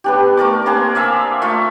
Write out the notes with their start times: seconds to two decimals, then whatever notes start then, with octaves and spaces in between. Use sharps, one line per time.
0.04 B3 D4 G4
0.37 A3 A#4 D5 D6
0.66 A#3 C4 D4 G#4
0.95 D5 E5 F5 E6
1.42 A3 F4 E5